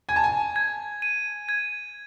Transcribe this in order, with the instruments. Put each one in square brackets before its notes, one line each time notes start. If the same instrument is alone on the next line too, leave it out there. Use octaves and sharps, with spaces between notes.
[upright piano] G#5 [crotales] G#6
[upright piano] A5
G#5
[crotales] G#6
D#7
G#6